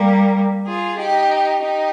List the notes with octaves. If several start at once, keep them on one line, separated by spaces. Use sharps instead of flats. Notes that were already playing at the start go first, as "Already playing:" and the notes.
Already playing: G3 A#3
F4 G#4
D#4 G4
D#4 G4